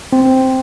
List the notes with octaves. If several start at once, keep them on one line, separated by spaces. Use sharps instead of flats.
C4